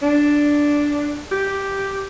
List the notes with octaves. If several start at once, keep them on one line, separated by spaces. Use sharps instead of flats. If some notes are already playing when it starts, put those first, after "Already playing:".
D4
G4